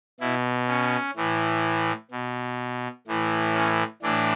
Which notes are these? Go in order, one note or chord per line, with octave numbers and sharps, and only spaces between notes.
B2 E4
C#4
A2 E3
B2
A2 E3
C#4
A2 E3 D4